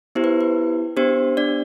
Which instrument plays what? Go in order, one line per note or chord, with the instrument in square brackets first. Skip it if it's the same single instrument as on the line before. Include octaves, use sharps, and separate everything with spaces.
[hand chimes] B3 E4 G4 C5
B4
B4
B3 D4 G4 C5
D4 D5